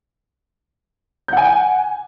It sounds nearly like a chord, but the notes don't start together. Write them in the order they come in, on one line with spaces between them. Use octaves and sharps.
G6 F#5 G#5